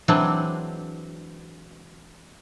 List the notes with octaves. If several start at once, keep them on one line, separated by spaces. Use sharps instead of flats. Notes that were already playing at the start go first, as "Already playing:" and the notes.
E3 F#3 G#3 C4 D4